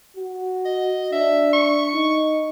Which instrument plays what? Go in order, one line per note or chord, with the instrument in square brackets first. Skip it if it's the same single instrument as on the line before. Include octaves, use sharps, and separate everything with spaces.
[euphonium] F#4
[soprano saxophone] D#5
[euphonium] D4 [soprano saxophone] E5
[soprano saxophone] C#6
[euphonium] D#4